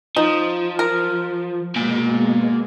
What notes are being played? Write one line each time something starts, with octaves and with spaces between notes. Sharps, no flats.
F3 D#4
A#4
B2 G#3 A#3 G#5